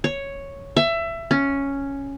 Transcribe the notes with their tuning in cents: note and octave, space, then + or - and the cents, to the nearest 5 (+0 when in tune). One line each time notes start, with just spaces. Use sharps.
C#5 +0
E5 +20
C#4 +0